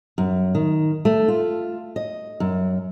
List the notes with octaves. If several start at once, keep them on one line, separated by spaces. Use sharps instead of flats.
F#2
D#3
A3
F4
D#5
F#2